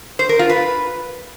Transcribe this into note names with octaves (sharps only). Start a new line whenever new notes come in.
C5
A#4
F4
B4